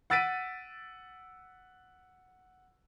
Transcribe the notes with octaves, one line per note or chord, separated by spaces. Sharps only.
F#5 E6 A6 B6 D7 D#7